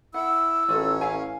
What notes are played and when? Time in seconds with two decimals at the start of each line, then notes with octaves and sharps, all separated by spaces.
0.14 E4 F#5 E6
0.69 A1 C#4 F4 A4
1.01 E4 F5 G#5